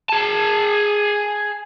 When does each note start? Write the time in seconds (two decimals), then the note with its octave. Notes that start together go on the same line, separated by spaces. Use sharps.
0.09 G#4 A5